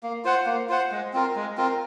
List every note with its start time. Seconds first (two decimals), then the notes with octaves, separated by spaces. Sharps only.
0.03 A#3
0.24 F4 C5 F#5
0.46 A#3
0.69 F4 C5 F#5
0.91 G#3
1.13 C4 F4 A#4
1.36 G#3
1.57 C4 F4 A#4